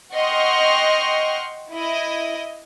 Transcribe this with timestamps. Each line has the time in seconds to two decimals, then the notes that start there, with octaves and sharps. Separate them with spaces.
0.14 D#5 F#5 G5 C6 C#6 F6
1.72 E4 D#5